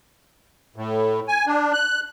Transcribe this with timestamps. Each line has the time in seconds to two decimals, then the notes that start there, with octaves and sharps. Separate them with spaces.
0.76 A2
1.28 G#5
1.47 D4
1.73 F#6